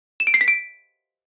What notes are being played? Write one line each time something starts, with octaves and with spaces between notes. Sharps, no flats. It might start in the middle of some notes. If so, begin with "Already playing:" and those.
E7
D7
C7
B6
D7